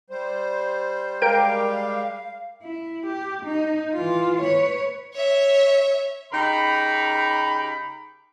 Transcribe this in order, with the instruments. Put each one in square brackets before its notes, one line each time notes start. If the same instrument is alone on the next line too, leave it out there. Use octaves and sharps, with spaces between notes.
[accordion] G3 C5
[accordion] G3 G#3 G4 [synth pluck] A#4 G5 D7 [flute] F5
[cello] E4
G4
D#4
E3 F4
B4 C#5
[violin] C#5 E5
[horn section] C#3 D#4 G4 A#4 B5